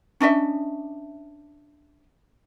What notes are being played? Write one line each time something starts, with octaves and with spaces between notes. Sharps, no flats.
C#4 D4 D#5 E5